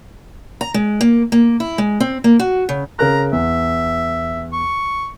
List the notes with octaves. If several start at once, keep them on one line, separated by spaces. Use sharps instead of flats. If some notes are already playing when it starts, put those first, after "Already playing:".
A#5
G#3
A#3
A#3
E4
G#3
C4
A#3
F#4
C#3
C#3 A#4 A#5 F#6
E2 E5
C#6